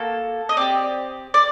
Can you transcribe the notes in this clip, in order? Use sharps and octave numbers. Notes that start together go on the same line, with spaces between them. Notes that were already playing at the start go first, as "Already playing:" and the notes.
Already playing: A#3 F#4 A4
D#5
C4 G4 D5
D5